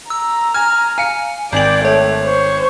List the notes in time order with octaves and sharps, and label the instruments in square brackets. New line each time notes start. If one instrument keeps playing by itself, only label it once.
[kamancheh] A#5 [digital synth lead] E6
[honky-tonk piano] G#5 [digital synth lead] F6
[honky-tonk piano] F5 C#7 [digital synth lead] G#5
[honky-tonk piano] G#1 F#7 [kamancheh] D5 G5
[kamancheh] A3 [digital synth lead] C#5
[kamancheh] C5 C#6